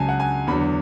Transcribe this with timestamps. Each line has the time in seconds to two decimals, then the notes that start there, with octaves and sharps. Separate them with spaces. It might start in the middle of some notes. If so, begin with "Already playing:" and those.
Already playing: C#2 C#3 F#3 G#5 A5
0.09 F#5
0.20 G#5
0.47 E2 D3 F#3 B5